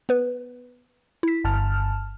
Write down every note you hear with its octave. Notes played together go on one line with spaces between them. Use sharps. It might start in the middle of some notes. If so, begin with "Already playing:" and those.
B3 B4
E4 B6
G1 A5 F6